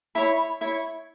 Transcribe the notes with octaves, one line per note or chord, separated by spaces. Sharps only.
E4 C#5 B5
E4 C#5